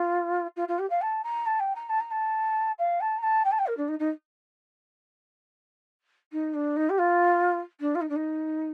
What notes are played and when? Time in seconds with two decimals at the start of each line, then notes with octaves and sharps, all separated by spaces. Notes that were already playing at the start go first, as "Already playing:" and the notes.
Already playing: F4
0.56 F4
0.68 F4
0.79 G4
0.90 F5
1.01 A5
1.23 A#5
1.46 A5
1.59 G5
1.75 A#5
1.89 A5
2.00 A#5
2.11 A5
2.78 F5
3.00 A5
3.18 A#5
3.22 A5
3.44 G5
3.51 A5
3.58 G5
3.66 A#4
3.77 D4
3.88 D#4
3.99 D#4
6.32 D#4
6.54 D4
6.76 D#4
6.89 G4
6.98 F4
7.80 D4
7.95 F4
8.01 D#4
8.09 D4
8.16 D#4